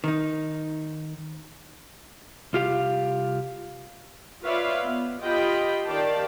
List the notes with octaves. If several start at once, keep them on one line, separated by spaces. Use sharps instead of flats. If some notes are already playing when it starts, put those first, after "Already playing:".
D#3 D#4
C2 F4 G4 F5
F4 B4 C#5 D5 E5 F5
B3
F4 G4 D#5 G5 B5
D#3 G4 D5 F5 G5 A5